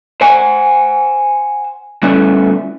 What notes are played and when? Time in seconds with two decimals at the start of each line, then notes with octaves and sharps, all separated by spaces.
0.21 C5 F#5 G#5
2.03 G3 A3 B3 C#4 E4